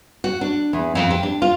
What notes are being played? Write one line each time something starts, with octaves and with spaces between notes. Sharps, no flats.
F#4
D4
E2
F2
G4
D4
F4